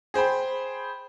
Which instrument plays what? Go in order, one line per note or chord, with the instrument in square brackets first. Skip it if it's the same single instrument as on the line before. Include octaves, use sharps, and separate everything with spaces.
[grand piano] G#4 C5 G5 B5